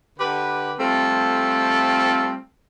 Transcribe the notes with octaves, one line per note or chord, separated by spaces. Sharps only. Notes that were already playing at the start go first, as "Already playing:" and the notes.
D3 G4 B4
G3 A3 C4 F4 A4